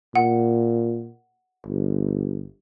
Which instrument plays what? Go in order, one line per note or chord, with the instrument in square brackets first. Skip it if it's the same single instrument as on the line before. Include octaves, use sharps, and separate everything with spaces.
[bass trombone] A#2 [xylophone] F#5
[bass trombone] G1